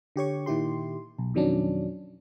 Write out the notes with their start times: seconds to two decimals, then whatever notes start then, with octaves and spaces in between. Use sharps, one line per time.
0.16 D3 G4 C#5 C#6
0.46 A#2 D#3 E4 G4 C6
1.18 B1
1.34 F2 B2 D#3 F#3 C#4 D4